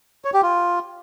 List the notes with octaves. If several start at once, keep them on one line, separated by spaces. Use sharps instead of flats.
C#5
G4
F4